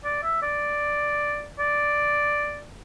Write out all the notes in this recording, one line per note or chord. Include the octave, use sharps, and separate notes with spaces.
D5
E5
D5
D5